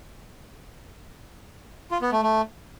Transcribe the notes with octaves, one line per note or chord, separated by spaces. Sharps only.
F4
B3
A3
A3